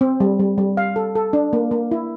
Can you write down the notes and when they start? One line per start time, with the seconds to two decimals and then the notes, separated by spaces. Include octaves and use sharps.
0.01 C4
0.20 G3
0.39 G3
0.58 G3
0.77 F5
0.96 A4
1.15 A4
1.33 D4
1.53 A#3
1.71 A#3
1.91 E4